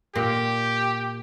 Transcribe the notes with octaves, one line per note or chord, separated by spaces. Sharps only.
A#2 G4